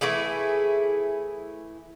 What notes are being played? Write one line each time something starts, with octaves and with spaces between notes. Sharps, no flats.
E3 A3 E4 G#4